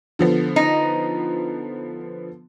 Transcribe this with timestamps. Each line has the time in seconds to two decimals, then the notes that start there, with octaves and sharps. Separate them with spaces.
0.19 D3 F3 B3
0.56 D#4